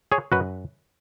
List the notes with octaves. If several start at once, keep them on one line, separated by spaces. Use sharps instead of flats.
G#4 C#5
F#2 F#4 B4